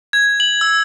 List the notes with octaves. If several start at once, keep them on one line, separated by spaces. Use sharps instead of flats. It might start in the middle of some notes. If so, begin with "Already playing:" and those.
G#6
F#7
E6